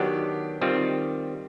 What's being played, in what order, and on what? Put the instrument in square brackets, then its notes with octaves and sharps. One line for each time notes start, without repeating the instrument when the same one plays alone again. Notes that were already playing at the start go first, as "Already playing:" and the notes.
Already playing: [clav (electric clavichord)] D#3 F#3 B3 D4 [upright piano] G4
[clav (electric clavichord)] D#3 G3 C4 F4